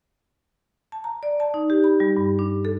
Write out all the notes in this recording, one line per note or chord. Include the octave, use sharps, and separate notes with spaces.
A5
A#5
D5
A5
D#4
G4
B5
G3
G2
D4
A4